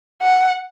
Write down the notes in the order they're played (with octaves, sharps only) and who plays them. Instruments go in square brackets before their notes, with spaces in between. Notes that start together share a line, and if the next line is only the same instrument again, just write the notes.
[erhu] F#5